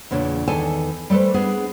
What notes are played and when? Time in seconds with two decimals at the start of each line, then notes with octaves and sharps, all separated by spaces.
0.11 E2 A#2 C#3 D4
0.48 E2 D#3 A4 G#5 A5
1.10 G3 A3 A4 B4 C5
1.34 B3 D4 G#4